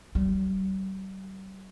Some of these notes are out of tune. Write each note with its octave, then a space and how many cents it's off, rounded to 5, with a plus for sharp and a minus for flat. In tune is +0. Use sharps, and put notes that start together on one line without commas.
G3 -40